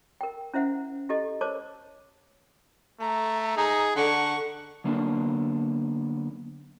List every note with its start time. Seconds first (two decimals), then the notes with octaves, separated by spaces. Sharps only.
0.21 A#4 G5
0.54 C#4 E4 C5 E5 F#5
1.09 E4 G4 A4 D#5
1.41 A#4 C5 C#5 A5 D6
3.01 A3 A#5
3.57 D#4 G#4
3.96 D3 F#5 C#6
4.84 D3 F#3 A#3 B3 D4